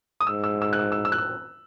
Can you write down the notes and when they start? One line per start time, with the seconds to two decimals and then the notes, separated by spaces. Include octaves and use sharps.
0.21 D#6
0.27 G#2 E6
0.44 E6
0.62 E6
0.73 F#6
0.79 E6
0.92 E6
1.05 E6
1.12 F#6
1.18 E6